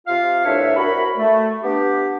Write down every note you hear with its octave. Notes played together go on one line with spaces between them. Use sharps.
C3 F4 F5
C2 A2 D4 B4 C#5 E5
C2 F#4 A#4 B5
A3
B3 D4 G4